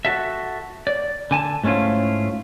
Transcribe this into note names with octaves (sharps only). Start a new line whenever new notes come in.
F#4 A4 E5
D5
D3 G#5 A5
G#2 A3 C#4 E4 F4